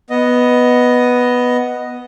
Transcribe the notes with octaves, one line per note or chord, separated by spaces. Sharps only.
B3 D#5